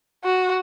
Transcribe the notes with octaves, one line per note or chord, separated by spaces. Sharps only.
F#4